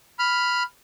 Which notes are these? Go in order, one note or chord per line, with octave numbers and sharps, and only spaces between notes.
B5 F6